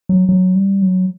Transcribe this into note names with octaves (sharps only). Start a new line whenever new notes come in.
F#3
F#3
G3
F#3